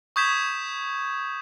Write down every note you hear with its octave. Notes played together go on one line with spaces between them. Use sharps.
C#6 D#6 G6 G#6 B6 E7